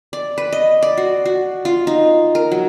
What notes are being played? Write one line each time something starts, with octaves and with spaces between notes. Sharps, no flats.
D5
B4
D#5
D5
F#4
F#4
F4
D#4
A#4
F#3